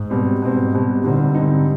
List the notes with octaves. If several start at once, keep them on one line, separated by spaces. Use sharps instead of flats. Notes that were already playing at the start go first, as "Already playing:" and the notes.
Already playing: G#2
B2 G3 C4
G#2 B2 G3 C4
B2 G3 C4
A#2 D3 G3 C4 D#4
G#2 D3 G3 C4 D#4